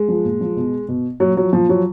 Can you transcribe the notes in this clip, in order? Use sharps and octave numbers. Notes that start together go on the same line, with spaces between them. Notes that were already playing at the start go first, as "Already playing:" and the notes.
Already playing: G#3
F3
A#2
F3
B2
B2
A#2 F#3
F3 F#3
A#2 F3
F3 F#3